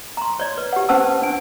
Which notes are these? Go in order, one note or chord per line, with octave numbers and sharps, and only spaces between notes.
A#5 C6
C#5 D5
B4
G4 F#5
C#4 B4 C5 F#5 A5 E6
D4 G#5